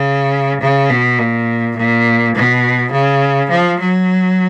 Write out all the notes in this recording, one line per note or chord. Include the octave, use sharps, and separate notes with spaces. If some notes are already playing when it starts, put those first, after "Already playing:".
Already playing: C#3
C#3
B2
A#2
A#2
B2
C#3
F3
F#3